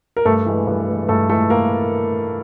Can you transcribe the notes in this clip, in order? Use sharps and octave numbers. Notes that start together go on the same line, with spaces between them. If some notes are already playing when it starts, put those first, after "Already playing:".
A#4
G2 A3 A4
E3 G#3
G2
E3 G#3
G2 A3 A4
E3 G#3 A3 A4
A#3 A#4